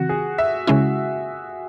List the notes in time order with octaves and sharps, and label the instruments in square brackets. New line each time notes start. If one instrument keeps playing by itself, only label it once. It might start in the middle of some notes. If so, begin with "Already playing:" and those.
Already playing: [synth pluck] C#3 E3 C4 [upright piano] F#4
[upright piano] G#4
E5
[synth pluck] C#3 G#3 C#4 E4